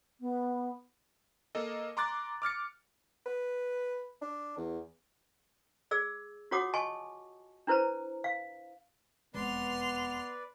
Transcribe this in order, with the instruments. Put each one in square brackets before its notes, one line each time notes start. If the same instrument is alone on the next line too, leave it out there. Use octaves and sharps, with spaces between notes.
[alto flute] B3
[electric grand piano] A#3 A4 D#5
A#5 C6 D6 F#6 A6
D6 F6 A6 C#7
[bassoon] B4
D4
E2
[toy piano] G#4 D5 E6
F4 F#4 C#5 F#5 D6 D#6
D#5 G#5 A5 C6 C#6
D4 E4 B4 C5 A#5
F5
[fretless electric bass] E1 F2 G#3 [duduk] B3 [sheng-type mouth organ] B4 D5 [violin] C6 F7